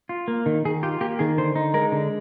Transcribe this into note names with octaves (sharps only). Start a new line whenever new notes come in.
F4
A#3
D#3
D#3 G#4
F4 G4
A#3 G4
D#3 G#4
D3 C5
D#4
G#3 A#4
D3